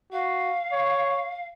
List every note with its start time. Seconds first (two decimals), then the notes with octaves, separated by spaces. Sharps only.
0.13 F#4 F5
0.72 C#5